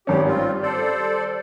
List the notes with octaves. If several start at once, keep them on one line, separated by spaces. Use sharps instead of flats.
G#1 C#4 G4
G3 C4 F4
A4 C5 D5